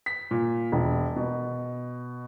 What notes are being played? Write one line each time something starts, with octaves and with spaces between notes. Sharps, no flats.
B6
A#2
E1
B2